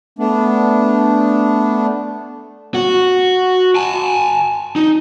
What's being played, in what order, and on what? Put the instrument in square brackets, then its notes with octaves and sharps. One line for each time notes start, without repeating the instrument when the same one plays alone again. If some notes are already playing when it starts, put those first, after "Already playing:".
[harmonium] A3 B3 D4
[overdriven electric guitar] F#4
G#5 A5
D#4